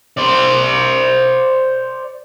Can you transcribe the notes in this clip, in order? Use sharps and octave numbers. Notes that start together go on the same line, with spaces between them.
C5 D5